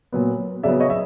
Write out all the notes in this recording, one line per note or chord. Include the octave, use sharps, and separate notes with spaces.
A#2 F#3 B3
C#3 F#3 B3 D5 E5
C#5 D#5
E5